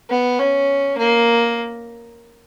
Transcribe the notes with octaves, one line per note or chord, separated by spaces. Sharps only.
B3
C#4
A#3